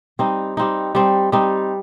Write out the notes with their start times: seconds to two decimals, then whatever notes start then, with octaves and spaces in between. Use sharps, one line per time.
0.19 G3 C4 D#4
0.57 G3 C4 D#4
0.95 G3 C4 D#4
1.32 G3 C4 D#4